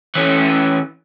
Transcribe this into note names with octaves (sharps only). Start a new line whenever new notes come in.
E3 C#4